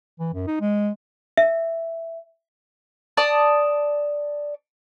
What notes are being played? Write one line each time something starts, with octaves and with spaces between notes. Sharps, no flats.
E3
F#2
D#4
G#3
E5
D5 A5 D#6